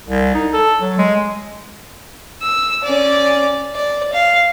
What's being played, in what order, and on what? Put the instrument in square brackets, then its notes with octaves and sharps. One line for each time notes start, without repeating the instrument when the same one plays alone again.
[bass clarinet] C2
D#4
A4
F#3
G#3
[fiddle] E6
C#4 D5
D5
F5